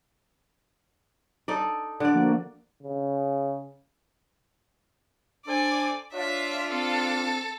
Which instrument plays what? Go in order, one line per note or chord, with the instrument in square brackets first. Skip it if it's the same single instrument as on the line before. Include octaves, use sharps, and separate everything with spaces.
[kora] D#4 A4 D5
D3 D5
[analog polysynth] F3 A#3 F#4
[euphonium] C#3
[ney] D4 [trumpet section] A4 C5 G#5 [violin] D5
[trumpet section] D4 F4 [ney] C#5 [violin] E5
[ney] C4 [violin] A4